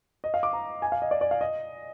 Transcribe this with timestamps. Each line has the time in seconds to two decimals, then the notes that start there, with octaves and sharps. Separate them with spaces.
0.24 D#5
0.34 F5
0.43 D6
0.53 A#5
0.82 G#5
0.92 F5
1.02 D#5
1.11 D5
1.21 D5
1.31 F5
1.41 D#5